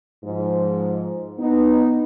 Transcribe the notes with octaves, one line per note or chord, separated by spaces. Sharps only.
G#2 F3
B3 D#4